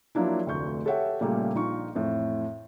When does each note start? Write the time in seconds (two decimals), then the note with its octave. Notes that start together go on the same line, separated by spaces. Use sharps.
0.15 F3 F#3 A#3 D4 E4
0.46 F1 D2 D3 C#6 G6
0.85 G4 A4 C#5 E5 F#5 G5
1.21 A#2 C#3 G3 A3 A#3
1.55 A#1 D#4 F4 C#6
1.95 F2 A2 E3